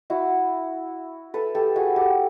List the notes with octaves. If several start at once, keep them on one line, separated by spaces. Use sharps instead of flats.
E4 F#4
A4 B4
G4 A4
F#4 G#4
G4 A4